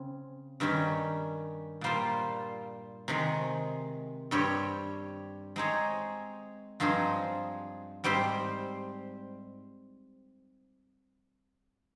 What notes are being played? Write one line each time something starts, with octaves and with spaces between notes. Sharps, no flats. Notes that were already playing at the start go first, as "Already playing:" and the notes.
Already playing: C#3 C4
G2 D#3 G3 C#4 G4
A#2 G3 A#3 F4 C5
C3 D#3 G#3
G2 G3 C4 G4 C#5
G#3 C4 D#4 G#4 C#5
G2 F3 C4 D#4 G#4
G#2 G3 C4 G4 C5